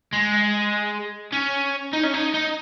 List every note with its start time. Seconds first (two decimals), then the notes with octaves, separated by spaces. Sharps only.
0.13 G#3
1.33 C#4
1.93 D#4
2.04 C#4
2.14 D#4
2.34 D#4